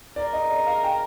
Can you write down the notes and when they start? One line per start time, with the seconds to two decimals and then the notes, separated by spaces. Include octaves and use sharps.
0.16 A#4 D5
0.33 D#5
0.50 D5
0.67 F5
0.84 G5